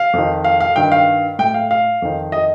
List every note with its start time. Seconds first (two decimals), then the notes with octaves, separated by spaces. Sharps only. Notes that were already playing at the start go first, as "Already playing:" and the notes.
Already playing: F5
0.13 F2 D#3
0.44 F5
0.61 F5
0.76 G2 D#3 G5
0.92 F5
1.39 A2 G5
1.54 F5
1.71 F5
2.02 F2 D#3
2.32 D#5